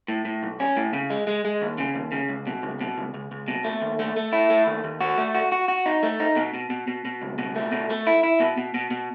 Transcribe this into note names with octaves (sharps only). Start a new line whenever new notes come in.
A2
A2
B1
C#4
A2
C#3
G#3
G#3
G#3
D#2
C#3
D#2
C#3
C#2
B2
C#2
B2
C#2
C#2
C#2
B2
A3
D#2
A3
A3
E4
A3
D#2
D#2
F#4
A3
F#4
F#4
F#4
D#4
A3
D#4
B2
B2
B2
B2
B2
C#2
B2
A3
B2
A3
E4
E4
B2
B2
B2
B2